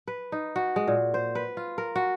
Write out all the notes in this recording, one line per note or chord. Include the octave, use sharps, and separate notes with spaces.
B4
D#4
F#4
G#3
A#2
C5
B4
F4
A#4
F#4